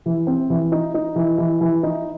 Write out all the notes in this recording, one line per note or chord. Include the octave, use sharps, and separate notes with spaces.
E3
C4
E3
D#4
D#4
E3
E3
E3
D#4